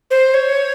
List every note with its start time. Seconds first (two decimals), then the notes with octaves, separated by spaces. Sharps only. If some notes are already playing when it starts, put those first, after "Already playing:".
0.11 C5
0.34 C#5